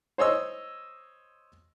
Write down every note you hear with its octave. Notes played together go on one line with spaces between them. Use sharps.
C5 C#5 D#5 E6